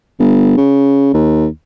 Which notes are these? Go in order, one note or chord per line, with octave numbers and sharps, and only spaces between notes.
G1
C#3
D#2